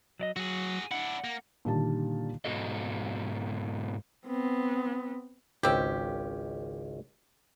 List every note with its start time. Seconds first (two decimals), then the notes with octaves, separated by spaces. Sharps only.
0.20 F#3 D5 D#5
0.36 F#3 F#4 G#4
0.91 D4 E4 F#5
1.24 A#3
1.65 A#2 D3 D#3 G3 D#4 A5
2.45 G#2 B2 F#4 A4 D#5
4.27 B3 C4
5.63 G#1 C#2 C4 C#4 G4